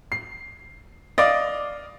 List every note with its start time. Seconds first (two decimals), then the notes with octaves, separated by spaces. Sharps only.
0.12 C7
1.18 D5 D#5 F5 D6